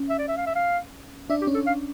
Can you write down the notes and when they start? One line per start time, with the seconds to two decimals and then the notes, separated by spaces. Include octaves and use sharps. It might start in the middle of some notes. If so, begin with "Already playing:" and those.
Already playing: C#4
0.10 E5
0.18 D5
0.28 E5
0.37 F5
0.47 E5
0.55 F5
1.30 D4 E5
1.41 G4
1.47 C#4
1.54 A4
1.67 F5